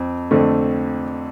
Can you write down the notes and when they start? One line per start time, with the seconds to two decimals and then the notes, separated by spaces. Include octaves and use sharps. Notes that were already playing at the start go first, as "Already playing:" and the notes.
Already playing: F2 C4
0.31 F2 D3 A3 C4